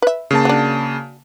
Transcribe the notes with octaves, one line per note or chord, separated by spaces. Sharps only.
B4 E5
C#3 A#3 A5
F#3 D4